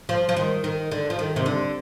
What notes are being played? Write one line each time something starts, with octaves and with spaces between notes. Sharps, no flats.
F3
F3
D#3
D#3
D3
F3
D#3
C3
D3